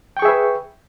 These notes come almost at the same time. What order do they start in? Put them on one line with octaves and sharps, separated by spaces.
G5 C#6 G#4 E5 B4